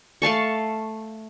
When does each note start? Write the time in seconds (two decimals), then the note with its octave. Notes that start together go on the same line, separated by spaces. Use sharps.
0.22 A3 F5 A5 C#6